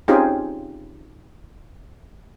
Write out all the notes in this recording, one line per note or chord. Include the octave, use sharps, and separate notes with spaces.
C4 C#4 D#4 F4 G4 G#4